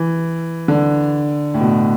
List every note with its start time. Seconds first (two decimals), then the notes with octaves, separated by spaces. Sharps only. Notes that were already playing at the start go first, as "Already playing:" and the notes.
Already playing: E3
0.68 D3
1.54 A2
1.60 B2